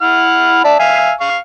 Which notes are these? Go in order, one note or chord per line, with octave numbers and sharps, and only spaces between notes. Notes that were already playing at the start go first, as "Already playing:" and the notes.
E4 F#5 F6
D5 E5 A5
E5 F5 G#5
F5 C#6